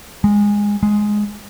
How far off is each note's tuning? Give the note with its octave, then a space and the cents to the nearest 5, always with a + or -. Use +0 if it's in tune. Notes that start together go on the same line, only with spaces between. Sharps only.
G#3 -15
G#3 +5